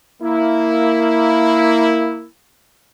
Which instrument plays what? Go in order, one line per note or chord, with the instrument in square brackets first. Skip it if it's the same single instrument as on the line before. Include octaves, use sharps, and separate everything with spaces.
[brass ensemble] A#3 E4